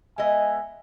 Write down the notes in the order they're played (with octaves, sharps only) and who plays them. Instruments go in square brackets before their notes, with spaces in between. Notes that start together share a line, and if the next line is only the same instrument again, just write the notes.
[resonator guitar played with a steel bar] G#3 B3 D#5 [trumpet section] E5 G#5